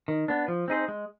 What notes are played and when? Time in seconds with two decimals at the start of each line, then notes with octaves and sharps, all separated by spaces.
0.08 D#3
0.28 B3 D4
0.48 F3
0.68 C4 D#4 G#4 C5
0.88 G#3